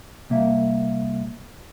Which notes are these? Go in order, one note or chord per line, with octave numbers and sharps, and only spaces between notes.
C2 A#3 E5